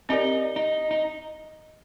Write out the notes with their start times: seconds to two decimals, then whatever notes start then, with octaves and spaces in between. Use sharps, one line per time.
0.09 C4 D#4 G4 A#4 D5
0.56 D#4
0.91 D#4